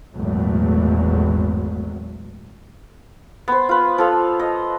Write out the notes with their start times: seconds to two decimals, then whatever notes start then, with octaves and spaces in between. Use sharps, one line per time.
0.14 G#1 E2 A#2 F#3 A3
3.48 B3 C5
3.69 F4 B4
3.98 F3 A4 F5
4.40 D#5